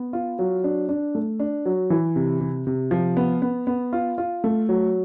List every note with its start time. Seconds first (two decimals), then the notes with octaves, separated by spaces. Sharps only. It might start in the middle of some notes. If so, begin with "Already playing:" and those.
Already playing: B3
0.13 F4
0.39 F#3
0.64 D4
0.89 D4
1.15 A3
1.39 D4
1.66 F#3
1.90 E3
2.16 C3
2.41 C3
2.67 C3
2.91 F3
3.17 B3
3.42 B3
3.67 B3
3.93 F4
4.18 F4
4.44 A3
4.69 F#3